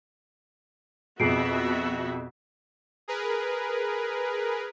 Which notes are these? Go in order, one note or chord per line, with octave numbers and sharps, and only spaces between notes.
F2 B2 B3 F#4 G#4 E5 C7 D7
G#4 A#4 B4